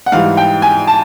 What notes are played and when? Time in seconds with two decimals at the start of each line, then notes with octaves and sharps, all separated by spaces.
0.06 F#5
0.12 G#2 E3 G3 F5
0.37 G5
0.62 G#5
0.87 A5